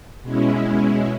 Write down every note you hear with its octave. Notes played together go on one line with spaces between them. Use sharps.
B2 G#3 C#4 E4